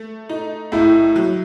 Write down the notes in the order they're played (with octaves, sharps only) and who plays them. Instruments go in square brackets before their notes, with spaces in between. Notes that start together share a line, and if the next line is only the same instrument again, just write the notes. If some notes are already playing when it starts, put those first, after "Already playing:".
Already playing: [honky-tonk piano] A3
D#4
[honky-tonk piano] A2 [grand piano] E4
[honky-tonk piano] F#3